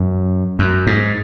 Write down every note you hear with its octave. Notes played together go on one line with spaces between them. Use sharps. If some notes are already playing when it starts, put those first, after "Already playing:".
Already playing: F#2
F#2
G#2